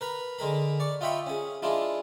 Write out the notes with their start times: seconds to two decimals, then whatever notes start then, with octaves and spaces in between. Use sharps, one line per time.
0.01 A#4 B4 A#5
0.39 D3 G#3 A#4 B5
0.80 D5 C#6
1.01 F4 D#5 E5 G5 B5 C#6
1.26 C#4 G#4
1.62 G#3 D4 E4 F4